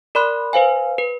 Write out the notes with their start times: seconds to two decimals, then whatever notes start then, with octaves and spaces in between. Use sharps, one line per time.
0.15 A#4 D5 B5 C6 F#6
0.53 B4 C5 F5 G#5
0.98 B4